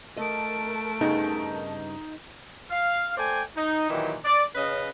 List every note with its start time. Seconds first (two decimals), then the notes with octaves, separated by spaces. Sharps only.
0.17 A3 A#4 D#5 A5 D7
1.01 G2 C#3 B3 D#4
2.71 F5
3.17 A3 C5 D5 G5 G#5
3.56 D#4
3.90 A#2 D#3 E3 F#3 G4
4.25 D5
4.55 C#3 C#4 B4 D#5